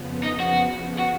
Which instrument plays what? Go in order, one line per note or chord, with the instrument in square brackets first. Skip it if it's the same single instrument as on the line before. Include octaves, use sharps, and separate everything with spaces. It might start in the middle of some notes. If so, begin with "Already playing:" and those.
Already playing: [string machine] F2 C#3 F3 B3
[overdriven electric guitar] D#4
F#4
F#4